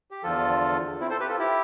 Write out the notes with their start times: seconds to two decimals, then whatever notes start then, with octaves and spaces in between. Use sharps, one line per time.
0.11 G4
0.23 E2 D3 F3 F4 A4
1.01 C4 E4
1.10 A4 C5
1.20 G4 B4
1.30 F4 A4
1.39 E4 G4